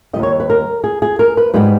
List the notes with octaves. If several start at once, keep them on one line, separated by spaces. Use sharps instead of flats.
D#3 G3 D#5
D#2 C#5
B4
A#4
G#4
G#4
A#4
B4
G#2 G3 B3 B4